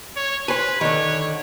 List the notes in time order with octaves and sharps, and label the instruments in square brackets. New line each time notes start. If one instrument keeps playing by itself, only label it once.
[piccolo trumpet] C#5
[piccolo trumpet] B4 [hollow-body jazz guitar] C5 G#5
[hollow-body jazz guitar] D3 D#3 [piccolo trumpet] C#5